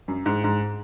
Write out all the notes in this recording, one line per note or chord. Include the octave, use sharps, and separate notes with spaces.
F#2
G#2
G#2